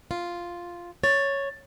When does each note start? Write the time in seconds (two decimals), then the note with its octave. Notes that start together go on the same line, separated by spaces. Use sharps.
0.11 F4
1.03 C#5 A6